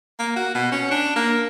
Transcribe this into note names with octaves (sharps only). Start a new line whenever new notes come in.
A#3
F#4
B2
C#4
D4
A#3